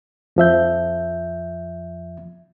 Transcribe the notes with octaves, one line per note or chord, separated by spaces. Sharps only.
F2 F3 E5 G6